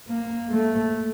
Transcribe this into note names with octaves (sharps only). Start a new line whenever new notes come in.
A#3
A3